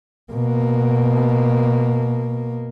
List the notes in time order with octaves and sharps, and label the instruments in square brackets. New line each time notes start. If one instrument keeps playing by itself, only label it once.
[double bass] B2 A#3